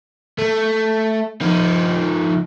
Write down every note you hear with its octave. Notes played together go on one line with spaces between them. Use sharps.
A3
F3 D#4